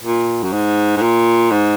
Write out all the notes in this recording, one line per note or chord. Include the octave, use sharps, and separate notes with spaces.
A#2
F#2
G#2
G#2
A#2
G#2